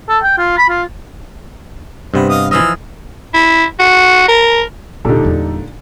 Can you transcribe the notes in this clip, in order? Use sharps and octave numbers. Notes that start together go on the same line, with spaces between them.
A4
G5
F4
B5
F4
G2 C3 B3 C5
D#5 F5 D#6
E3 F3 D#5 E6 F6
E4
F#4
A#4
D#1 A#2 D3 D#4 G4 A4
E2 G3